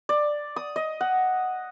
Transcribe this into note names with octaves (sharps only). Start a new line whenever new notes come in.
D5
D#6
D#5
F#5